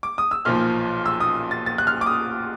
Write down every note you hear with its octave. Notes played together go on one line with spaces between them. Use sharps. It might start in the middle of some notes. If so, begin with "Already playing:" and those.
D6
D#6
E6
B1 A#2 F3 F6
E6
D#6
A6
A6
F#6
F6
D6
D#6